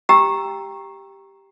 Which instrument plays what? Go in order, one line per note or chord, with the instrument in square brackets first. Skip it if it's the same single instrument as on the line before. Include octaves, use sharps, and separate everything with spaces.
[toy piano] G4 G5 A#5 E6